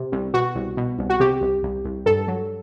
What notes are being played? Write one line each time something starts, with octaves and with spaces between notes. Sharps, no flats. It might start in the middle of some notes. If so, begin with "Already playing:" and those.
Already playing: C3
C2
B2 F#4
C2
B2
C2
F#4
C3 G4
C2
C2
C2
G2 A4
F#3